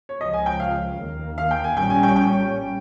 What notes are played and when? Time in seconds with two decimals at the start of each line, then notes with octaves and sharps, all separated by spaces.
0.09 C#5
0.21 C#2 C#3 F3 D#5
0.34 G#5
0.46 G5
0.60 F5
0.99 D#2 D#3 A#3
1.38 F5
1.51 G5
1.64 G#5
1.77 A#1 A#2 G3 C#4 G5
1.90 G#5
2.03 G5
2.16 G5